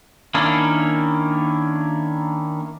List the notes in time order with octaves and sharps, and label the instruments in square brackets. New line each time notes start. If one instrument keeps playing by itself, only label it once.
[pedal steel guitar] D#3 A#3 C#4 D4 E4